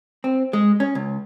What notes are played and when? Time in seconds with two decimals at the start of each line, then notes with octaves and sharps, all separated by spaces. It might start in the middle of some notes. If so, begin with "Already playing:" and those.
0.24 C4
0.53 G#3
0.80 C#4
0.95 C#2